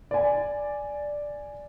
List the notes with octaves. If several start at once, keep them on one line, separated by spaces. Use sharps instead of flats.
D5 G#5